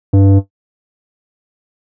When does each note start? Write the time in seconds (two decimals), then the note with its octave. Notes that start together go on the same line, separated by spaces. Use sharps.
0.13 G2